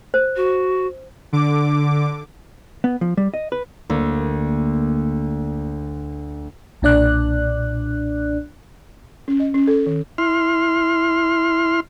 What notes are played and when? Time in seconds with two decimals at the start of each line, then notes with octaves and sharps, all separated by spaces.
0.14 C5
0.36 F#4
1.33 D3 D6
2.84 B3
3.01 F3
3.17 G3
3.34 D#5
3.52 B4
3.90 D2 A#3
6.82 B1 A#2 D4 D5 F#6
9.28 C#4
9.40 D#5
9.54 C#4
9.67 A4
9.86 D#3
10.18 E4 C6 F6